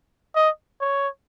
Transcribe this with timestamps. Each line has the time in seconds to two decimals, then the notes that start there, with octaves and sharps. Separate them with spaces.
0.35 D#5
0.81 C#5